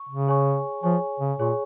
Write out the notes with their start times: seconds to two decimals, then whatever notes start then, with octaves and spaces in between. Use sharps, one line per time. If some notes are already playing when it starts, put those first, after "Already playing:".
Already playing: C#6
0.09 C#3
0.27 G#4 C#5 G#5 C#6
0.83 F3 G#4 C#5 G#5 C#6
1.20 C#3
1.39 A#2 G#4 C#5 G#5 C#6